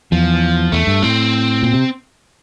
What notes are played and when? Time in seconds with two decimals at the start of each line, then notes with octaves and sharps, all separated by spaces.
0.12 E2 F3
0.72 E2 A3
0.87 G2
1.03 A2 C4
1.63 A#2
1.73 C3